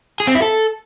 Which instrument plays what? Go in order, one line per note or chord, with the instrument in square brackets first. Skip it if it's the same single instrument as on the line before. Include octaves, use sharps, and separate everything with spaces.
[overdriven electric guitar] G#4
C4
E4
A4